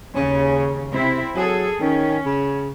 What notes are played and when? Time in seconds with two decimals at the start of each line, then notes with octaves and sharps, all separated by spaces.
0.15 D#2 C#3 C#4
0.92 C3 C4 E4 E5
1.35 F#3 G#4 A4
1.80 D#3 C#4
2.26 C#3